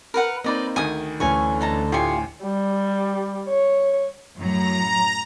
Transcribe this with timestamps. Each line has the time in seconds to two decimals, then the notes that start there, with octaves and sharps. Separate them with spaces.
0.14 A#4 B4 F#5
0.44 A#3 C4 D#4 B4 D5 D#5
0.76 D2 D#3 G#5 D#6
1.20 D2 D3 E3 C#4 G#5 C#6
1.61 D#4 A5 A#5
1.92 A2 F4 G4 G#5 C#7
2.43 G3
3.49 C#5
4.39 F#2 A2 F#3 A#5